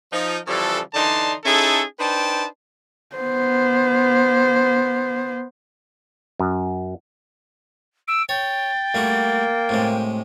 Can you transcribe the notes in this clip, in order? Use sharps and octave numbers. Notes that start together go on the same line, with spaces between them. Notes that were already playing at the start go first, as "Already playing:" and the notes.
F3 D#4
C#3 E3 F3 G3 A4
D3 E3 D4 D#4 A5 C6
C#4 D#4 E4 G#4 A4
D4 D#4 B4 C5 G5 A5
B3 C5
F#2
E6 D7
C#5 G5 A6
G3 A3 A#3 F#4
A2 C3 G#3